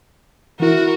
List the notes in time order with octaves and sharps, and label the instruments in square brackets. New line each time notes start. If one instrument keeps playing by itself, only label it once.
[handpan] E3 E4 [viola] F#4 A#4